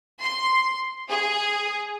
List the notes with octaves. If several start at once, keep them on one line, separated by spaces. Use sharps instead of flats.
C6
G#4